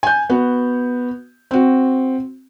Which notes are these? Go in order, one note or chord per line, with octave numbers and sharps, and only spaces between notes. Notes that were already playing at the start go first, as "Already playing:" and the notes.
G#5 G6
B3 F#4
C4 F#4